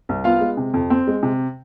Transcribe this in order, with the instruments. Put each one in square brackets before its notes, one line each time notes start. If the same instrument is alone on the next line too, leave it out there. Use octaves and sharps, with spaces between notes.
[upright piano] C2
B3 F4 F5
G#3
C3
F2
C4
G#3
C3